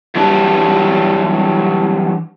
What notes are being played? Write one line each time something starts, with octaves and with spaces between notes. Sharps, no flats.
E3 F#3 G3 D4 G4